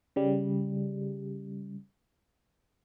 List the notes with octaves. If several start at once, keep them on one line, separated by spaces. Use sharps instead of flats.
C#3 G3